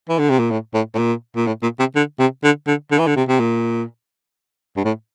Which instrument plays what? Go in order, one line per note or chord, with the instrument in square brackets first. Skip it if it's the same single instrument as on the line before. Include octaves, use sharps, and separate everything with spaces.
[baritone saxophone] E3
D3
C3
A#2
A2
A2
A2
A#2
A#2
A2
A#2
C3
D3
C3
D3
D3
D3
E3
D3
C3
C3
A#2
G2
A2